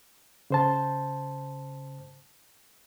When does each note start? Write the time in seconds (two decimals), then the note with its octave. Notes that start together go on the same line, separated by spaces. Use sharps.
0.50 C#3 C5 A5